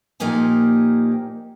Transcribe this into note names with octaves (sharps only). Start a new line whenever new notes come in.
A#2 F3 A#3 D#4 G4 G#5